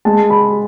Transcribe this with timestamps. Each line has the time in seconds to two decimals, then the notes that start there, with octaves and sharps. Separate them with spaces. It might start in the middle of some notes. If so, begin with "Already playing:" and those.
0.05 G#3 A5
0.30 B5